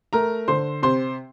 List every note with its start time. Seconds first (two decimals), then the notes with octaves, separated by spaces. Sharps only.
0.13 A3 A#4 A#5
0.48 D3 C5 C6
0.83 C3 C5 C6